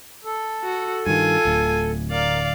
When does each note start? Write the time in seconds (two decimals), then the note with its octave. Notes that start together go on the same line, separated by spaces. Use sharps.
0.24 A4
0.63 F#4
1.06 G2 D#3 F4 G#5
1.45 D1 D2
2.11 A#4 D5 F5